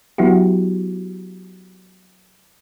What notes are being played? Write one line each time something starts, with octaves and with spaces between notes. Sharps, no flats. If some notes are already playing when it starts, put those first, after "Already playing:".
F#3 B3 E4 F#4 G4